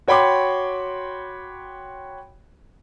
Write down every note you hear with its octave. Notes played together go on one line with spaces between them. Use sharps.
F#4 C#5 G5 B5 C6 D6